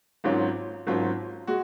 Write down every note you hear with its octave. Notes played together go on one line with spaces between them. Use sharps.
G#1 G#2 F#3 C#4 F4
G#1 G#2 F#3 C#4 F4
G#3 F#4